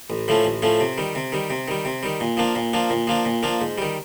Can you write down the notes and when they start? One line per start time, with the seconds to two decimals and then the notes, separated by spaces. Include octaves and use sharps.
0.10 A1
0.28 A2 F3 A3 C#4
0.45 A1
0.62 A2 F3 A3 C#4
0.80 C3
0.98 D#3 G3
1.15 C3
1.32 D#3 G3
1.50 C3
1.68 D#3 G3
1.85 C3
2.03 D#3 G3
2.20 A#2
2.37 F3 A#3 D4
2.55 A#2
2.73 F3 A#3 D4
2.90 A#2
3.08 F3 A#3 D4
3.25 A#2
3.43 F3 A#3 D4
3.61 G#2
3.78 D#3 G3